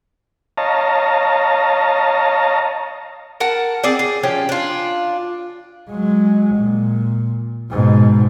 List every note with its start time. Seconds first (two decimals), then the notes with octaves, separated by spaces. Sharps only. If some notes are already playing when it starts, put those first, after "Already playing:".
0.58 C#5 D#5 F5 A5 A#5
3.40 A#4 F#5 A5
3.84 C4 G#4 D5
3.99 G#4
4.23 F3 C#4 G4
4.49 D4 F4
5.90 F#3 G#3
6.56 A#2
7.70 G#2 B2